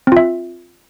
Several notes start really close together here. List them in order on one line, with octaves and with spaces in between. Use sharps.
C4 F4 E5